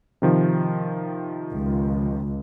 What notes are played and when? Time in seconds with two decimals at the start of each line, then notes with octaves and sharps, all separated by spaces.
0.22 C3 D#3 F3
1.54 C#2